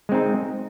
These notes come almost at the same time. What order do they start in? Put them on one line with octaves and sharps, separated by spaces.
G#3 C4 D#4